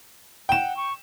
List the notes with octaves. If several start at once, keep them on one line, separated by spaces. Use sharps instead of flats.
F#5 G5 E7
C#6